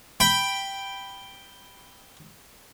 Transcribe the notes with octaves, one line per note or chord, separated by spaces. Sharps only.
G5 B5